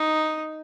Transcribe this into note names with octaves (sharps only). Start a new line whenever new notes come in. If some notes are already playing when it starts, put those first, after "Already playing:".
Already playing: D#4